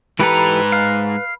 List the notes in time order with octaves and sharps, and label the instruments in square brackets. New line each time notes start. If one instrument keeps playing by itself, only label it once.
[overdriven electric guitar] G#2 A#5 [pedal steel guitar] E3 G4 A4 [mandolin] B4
[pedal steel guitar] F5